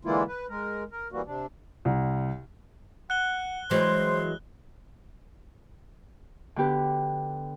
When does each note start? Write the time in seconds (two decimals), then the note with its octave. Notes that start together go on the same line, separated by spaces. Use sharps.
0.05 D3 E3 G#3 A#3 E4 F4
0.28 B4
0.49 G#3 A#4
0.92 A#4
1.12 D#2 E3 G3 A#3 F#4
1.26 C3 D4
1.85 C2
3.10 F#5 F#6 G7
3.71 E3 F#3 G#3 C5 C6
6.56 D3 B3 G4 B4